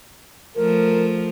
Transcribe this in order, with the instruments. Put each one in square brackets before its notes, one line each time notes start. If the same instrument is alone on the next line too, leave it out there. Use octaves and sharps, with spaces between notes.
[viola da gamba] F3 A3 [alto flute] A#4